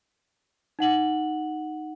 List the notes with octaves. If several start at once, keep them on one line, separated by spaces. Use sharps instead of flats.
D#4 F#5 F#7